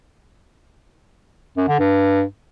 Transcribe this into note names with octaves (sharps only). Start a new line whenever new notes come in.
F#2
D3
G2